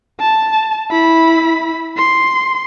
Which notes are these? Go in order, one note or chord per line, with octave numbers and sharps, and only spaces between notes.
A5
E4 B5
C6